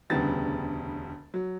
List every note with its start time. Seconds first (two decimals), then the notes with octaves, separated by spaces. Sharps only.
0.10 E1 D2 C#3 G3 B3 A6
1.34 F#3